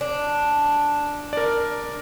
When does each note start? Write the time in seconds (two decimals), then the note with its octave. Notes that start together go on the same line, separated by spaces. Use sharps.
0.01 D4
1.33 A#4 D5